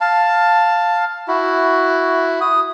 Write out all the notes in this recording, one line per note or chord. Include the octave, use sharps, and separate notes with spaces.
F5 A5
E4 F#4
D#6